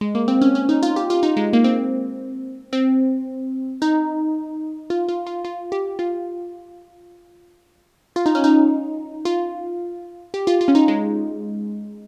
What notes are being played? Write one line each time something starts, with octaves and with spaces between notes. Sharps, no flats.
G#3
A#3
C4
C#4
C#4
D#4
F4
G4
F4
D#4
G#3
A#3
C4
C4
D#4
F4
F4
F4
F4
G4
F4
F4
D#4
C#4
D#4
F4
G4
F4
F4
C#4
D#4
G#3